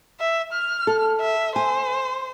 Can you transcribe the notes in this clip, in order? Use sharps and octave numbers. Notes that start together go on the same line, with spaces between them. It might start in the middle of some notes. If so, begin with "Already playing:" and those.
E5
F6
A4
E5
C5 G#5